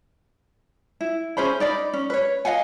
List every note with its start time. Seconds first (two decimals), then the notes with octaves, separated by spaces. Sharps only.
1.01 E4
1.37 C#4 G#4 C5 B5
1.60 D#4 D5 B5
1.93 C#4
2.10 B4 C#5
2.45 D#5 F5 F#5 G#5